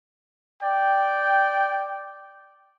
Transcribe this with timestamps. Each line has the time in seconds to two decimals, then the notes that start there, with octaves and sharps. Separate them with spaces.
0.62 D5 G5